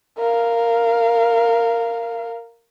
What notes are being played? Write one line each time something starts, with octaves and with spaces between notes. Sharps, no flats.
A#4 F5